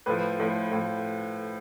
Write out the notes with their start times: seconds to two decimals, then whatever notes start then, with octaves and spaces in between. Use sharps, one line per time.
0.06 A2 F3 B4
0.40 A2 F3
0.72 A2 F3